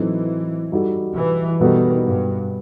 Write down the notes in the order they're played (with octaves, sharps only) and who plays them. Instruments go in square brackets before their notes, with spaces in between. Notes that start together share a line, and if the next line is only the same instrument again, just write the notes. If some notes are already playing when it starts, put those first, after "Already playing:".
Already playing: [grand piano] A2 F#3 C4 D#4 A4 [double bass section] E3
[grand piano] G3 D#4 F#4 A4
[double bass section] E3
[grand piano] B2 G3 B3 F#4 A4 [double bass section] D#3
[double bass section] G2